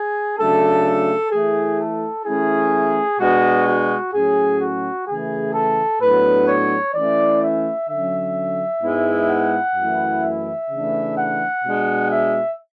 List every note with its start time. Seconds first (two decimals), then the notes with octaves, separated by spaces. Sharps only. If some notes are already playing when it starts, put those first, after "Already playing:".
Already playing: G#4
0.38 C#3 F#3 A3 D4 A4
1.31 E3 A3 E4 G#4
1.79 A4
2.25 E3 A3 C#4 E4 G#4
3.19 B2 G#3 B3 D4 F#4
3.67 F#4
4.13 A2 F#3 C#4 G#4
4.60 F#4
5.07 C#3 E3 A3 G#4
5.54 A4
6.01 A2 F#3 B3 D4 B4
6.48 C#5
6.95 E3 A3 C#4 E4 D5
7.42 E5
7.88 D3 F#3 C#4 E5
8.82 G#2 G#3 B3 E4
9.29 F#5
9.76 F#2 E3 A3 E4
10.23 E5
10.69 C#3 E3 A3 D4
11.17 F#5
11.64 B2 G#3 D4
12.10 E5